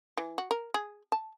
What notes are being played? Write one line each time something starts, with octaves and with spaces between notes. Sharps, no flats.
E3
F#4
A#4
G#4
A5